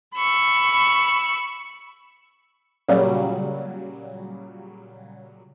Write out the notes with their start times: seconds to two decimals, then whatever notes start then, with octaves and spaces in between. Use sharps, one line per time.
0.16 B5 C#6 E6
2.88 A#2 C#3 F#3 G3